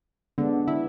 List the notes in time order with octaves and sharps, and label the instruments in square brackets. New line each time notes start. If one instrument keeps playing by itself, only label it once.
[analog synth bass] D3 [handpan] G#3 B3 D4
[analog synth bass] E4